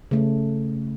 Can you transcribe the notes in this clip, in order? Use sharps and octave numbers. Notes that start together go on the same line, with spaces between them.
C#3 A3